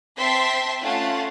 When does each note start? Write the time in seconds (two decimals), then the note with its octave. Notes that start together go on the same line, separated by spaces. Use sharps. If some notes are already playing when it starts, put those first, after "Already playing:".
0.18 C4 E5 G5 A5 C6 B6
0.82 A3 C#4 F4 F5 F#5 A5